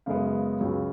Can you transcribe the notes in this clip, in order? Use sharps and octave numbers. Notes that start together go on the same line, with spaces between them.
F#2 C#3 G#3 B3 F5
C#2 C#3 F#3